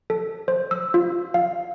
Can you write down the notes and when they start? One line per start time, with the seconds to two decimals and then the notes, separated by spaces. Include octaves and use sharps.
0.10 A4
0.48 C5
0.71 E6
0.94 F4
1.34 F5